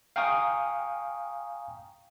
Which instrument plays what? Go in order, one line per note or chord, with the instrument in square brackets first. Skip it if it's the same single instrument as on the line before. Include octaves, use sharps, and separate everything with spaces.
[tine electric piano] F5 G5 G#5 A#5 C#6 D#6